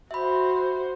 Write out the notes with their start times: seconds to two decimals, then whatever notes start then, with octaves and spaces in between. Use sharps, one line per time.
0.11 F#4 C5 E5 B5